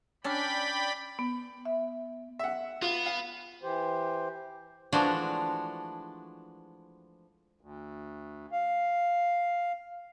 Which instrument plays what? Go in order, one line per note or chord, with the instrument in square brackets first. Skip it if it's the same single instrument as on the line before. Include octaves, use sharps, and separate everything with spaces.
[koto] C#4 D4 [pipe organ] D5 G5 B5
[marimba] B3
E5
[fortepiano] E5 F#5
[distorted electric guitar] B3 [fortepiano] F4
[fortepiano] F5
[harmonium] E3 G4 C5
[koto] E3 F3 G#3 A3 D4 F#4
[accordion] D2
F5